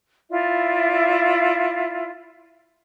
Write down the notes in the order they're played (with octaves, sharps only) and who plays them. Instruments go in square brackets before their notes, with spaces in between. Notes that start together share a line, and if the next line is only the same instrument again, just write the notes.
[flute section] E4 F4 D5 E5